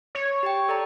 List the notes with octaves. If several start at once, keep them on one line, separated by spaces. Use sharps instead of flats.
C#5
G4 G5
A4 D5 A#5